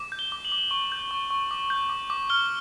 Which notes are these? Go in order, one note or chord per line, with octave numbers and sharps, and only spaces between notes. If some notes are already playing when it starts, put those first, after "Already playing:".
Already playing: D6
G6
G7
D6
F#7
D6
C#6
G6
C#6
C#6
D6
G6
D6
D6
F6 G7